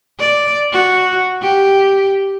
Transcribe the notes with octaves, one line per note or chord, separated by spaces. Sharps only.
D5
F#4
G4